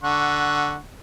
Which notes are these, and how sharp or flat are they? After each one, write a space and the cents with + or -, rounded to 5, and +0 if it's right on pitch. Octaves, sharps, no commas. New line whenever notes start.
D3 +0 F#5 +0 C#6 +0